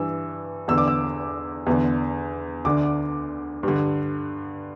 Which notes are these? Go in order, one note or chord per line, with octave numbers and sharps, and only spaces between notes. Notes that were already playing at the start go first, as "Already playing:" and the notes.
Already playing: G2 E3 E6
E2 D3 E6
D6
E6
E2 D3
D2 D3 D6
G2 D3